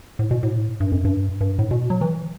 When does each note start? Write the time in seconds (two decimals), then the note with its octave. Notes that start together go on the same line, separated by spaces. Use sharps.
0.19 A2
0.31 B2
0.43 A2
0.80 G2
0.92 F#2
1.05 G2
1.41 G2
1.59 A2
1.71 B2
1.90 F#3
2.01 E3